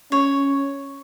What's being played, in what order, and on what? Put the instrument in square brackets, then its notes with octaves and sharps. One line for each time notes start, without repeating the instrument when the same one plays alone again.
[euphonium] C#4 [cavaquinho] C#5